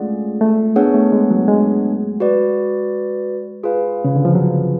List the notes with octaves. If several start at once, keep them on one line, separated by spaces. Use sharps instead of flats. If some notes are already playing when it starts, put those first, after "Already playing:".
Already playing: G#3 A3 C#4 F4 G#4 D5 F#5
A3
B3 D4 G#4 C#5 F#5
A3
G#3
F#3
G#3
F#4 B4 D5
F4 G#4 B4 F5
C#3
D3
F3
F#3